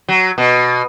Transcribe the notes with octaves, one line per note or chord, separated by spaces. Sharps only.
F#3
B2